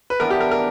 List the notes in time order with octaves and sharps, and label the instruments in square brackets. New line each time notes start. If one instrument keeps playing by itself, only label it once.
[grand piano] B4
[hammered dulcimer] E3 B3 D4 [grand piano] A#4
[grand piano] G4
A#4
A#4